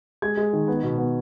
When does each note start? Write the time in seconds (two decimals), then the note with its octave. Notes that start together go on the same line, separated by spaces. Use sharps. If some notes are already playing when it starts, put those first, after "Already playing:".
0.22 G#3 G#6
0.37 G#3
0.53 D#3
0.68 B3
0.83 B2
0.98 B3